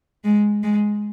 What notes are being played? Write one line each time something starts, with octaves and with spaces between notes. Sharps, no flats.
G#3
G#3